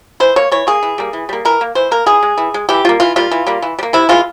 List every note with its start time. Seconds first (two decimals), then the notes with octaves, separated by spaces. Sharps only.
0.20 E3 C5
0.36 A#3 C#5
0.52 E3 C#5
0.67 A#3 G#4
0.83 E3
0.98 G3 A#3
1.13 E3
1.29 G3 A#3
1.45 E3 A#4
1.61 A#3
1.75 E3 C5
1.91 A#3 A#4
2.06 E3 G#4
2.23 G#3
2.38 E3
2.54 G#3
2.69 E3 G4
2.85 G3 A#3 F4
3.00 E3 F4
3.16 G3 A#3 F4
3.31 E3
3.47 G3 A#3
3.62 E3
3.79 G3
3.83 A#3
3.93 C3 E4
4.09 E3 G#3 F4